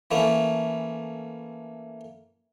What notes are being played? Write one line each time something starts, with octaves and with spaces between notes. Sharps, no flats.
E3 A3 A#3 C#4